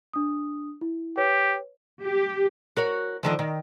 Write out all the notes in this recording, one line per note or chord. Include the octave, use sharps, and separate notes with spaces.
D4 D#6
E4
G4 B4 C#5
G4
F#4 A#4 C#5
D3 D#3 F3
D#3